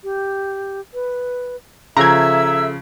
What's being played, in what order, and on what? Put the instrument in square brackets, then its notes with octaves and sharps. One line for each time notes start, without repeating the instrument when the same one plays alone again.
[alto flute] G4
B4
[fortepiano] C#3 F3 [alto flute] A4 [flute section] E5 E6 [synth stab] A#5 G#6